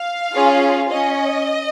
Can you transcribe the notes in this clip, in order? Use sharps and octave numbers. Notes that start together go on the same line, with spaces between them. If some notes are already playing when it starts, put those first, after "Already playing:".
Already playing: F5
C#4 F4 G#4
C#4 D#5